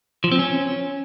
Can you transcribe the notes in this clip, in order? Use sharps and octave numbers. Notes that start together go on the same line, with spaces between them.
F3
C4
C#4